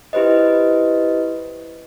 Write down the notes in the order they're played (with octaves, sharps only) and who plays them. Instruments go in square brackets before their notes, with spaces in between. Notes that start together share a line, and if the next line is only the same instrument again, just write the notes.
[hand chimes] E4 G4 B4 C5 D#5